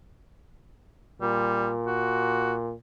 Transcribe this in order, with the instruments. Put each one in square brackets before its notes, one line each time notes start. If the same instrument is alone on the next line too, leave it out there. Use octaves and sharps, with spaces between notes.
[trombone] A#2 [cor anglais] G3
[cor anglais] F#4